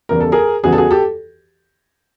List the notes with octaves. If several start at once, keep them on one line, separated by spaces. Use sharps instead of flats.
E2 C#3 E3 G3 A#4
A4
G#4 A#4
E2 C#3 E3 G3 F#4 G#4
A4
F#4 G#4
G4 A4